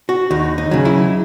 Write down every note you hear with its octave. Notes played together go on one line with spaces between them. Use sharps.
F#4
D#2 D#4
D#4
C#3 F#3
E4